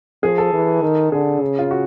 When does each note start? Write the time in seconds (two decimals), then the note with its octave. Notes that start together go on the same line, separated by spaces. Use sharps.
0.23 F3 G#4
0.38 A4
0.53 E3
0.82 D#3
1.12 D3 G#4
1.41 C#3
1.59 F4
1.71 F#4